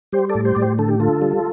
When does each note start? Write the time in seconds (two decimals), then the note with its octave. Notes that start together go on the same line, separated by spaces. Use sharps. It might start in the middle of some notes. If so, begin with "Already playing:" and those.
0.12 G3 G4 C5
0.29 A4 D5
0.35 A2
0.45 G4 C5
0.55 A2 D5
0.61 G4 C5
0.79 D3 A4
0.89 G4
1.00 D3 F4 A4
1.22 G3